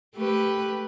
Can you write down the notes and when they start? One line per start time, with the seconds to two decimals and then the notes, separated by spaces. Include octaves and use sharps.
0.15 A3 G4 B4